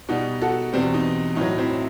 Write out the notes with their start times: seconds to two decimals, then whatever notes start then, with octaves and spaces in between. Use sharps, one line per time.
0.09 B2 G3 D#4 F#4
0.42 F#4 A4
0.73 E2 B2 G3 C4
0.94 D#4
1.36 A2 F#3 D#4
1.58 C4 E4